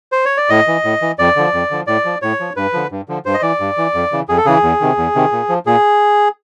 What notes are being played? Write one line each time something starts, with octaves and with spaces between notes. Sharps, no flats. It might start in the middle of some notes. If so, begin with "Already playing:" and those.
C5
C#5
D5
A2 D#5
E3
A2
E3
F2 D5
D3 F3
F2
D3 F3
A2 D5
F3
A2 C#5
F3
G2 B4
D3 F3
G2
D3 F3
G2 C5
D#5
E3 D5
G2
E3
F2
C#3 E3
F2 G#4
A4
C#3 E3 G#4
E2
C3 D#3
E2
C3 D#3
A#2
F3
A#2 G#4